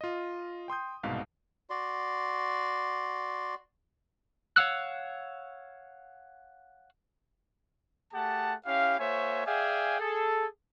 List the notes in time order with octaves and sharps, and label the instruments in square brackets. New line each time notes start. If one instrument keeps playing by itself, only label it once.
[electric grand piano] F4 D#5
G5 C6 D#6 G6
C2 G#2 B2 F5
[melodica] F#4 D5 C6
[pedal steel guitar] C#5 F5 F#5 E6 F#6
[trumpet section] A3 G4 G#4 F#5 A5
C#4 E4 G4 F5
A#3 F#4 C5 C#5 E5 G#5
G#4 D5 E5 F5 G5 G#5
G#4 A4